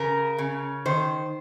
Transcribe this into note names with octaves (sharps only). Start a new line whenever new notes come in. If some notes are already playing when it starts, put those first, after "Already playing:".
Already playing: C#3 A#4
C#3
D#3 C5